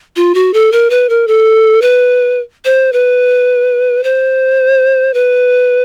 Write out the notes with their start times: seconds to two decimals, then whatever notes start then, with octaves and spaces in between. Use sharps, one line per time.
0.16 F4
0.35 F#4
0.54 A4
0.72 A#4
0.90 B4
1.09 A#4
1.28 A4
1.82 B4
2.65 C5
2.93 B4
4.04 C5
5.14 B4